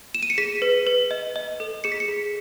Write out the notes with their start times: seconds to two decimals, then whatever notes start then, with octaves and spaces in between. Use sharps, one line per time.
0.15 E7
0.23 D#7
0.30 C#7
0.38 G#4 B6
0.62 B4
0.87 B4
1.11 D#5
1.36 D#5
1.60 A4
1.84 G#4 C#7
1.92 B6
2.00 C#7
2.08 G#4